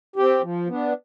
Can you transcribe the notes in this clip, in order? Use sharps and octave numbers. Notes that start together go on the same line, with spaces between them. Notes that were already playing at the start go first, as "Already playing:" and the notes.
C4 G4
F3
B3 D4